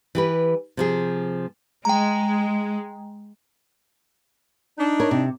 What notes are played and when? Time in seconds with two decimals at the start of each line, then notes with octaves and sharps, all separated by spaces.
0.15 E3 G4 B4
0.77 C3 F3 G#4
1.85 G#3 G5 A#5
4.78 D4 D#4
5.00 A#4 C#5
5.11 C3